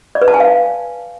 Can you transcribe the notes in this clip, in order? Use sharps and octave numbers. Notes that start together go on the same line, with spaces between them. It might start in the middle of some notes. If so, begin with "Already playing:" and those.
D5
B4
A5
G#5
F5